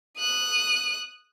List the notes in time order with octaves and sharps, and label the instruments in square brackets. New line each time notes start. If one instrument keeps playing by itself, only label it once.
[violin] D#6 F#6